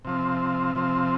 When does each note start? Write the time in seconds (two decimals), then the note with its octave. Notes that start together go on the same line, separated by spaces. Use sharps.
0.05 C3 F3 C4
0.75 C3 F3 C4